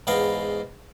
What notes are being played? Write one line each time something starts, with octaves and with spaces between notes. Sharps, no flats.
E2 G#2 B3 F5 G5 A#5